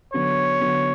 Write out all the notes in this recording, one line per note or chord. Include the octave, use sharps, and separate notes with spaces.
D3 F#3 B3 C#5
D3 F#3 B3